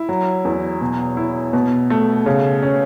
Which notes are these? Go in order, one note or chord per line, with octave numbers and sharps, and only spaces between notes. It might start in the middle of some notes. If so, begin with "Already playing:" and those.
Already playing: E4
F#3
E2
B2
E4
B2
A3
C#3
C#4